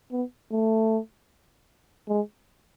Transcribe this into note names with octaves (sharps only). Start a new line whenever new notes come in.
B3
A3
G#3